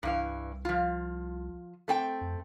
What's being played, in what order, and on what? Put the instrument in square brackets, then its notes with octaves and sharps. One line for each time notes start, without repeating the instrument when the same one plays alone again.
[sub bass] C2 [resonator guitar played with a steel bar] G2 E3 F5
[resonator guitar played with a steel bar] F3 F4
A3 C4 G5
[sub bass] F2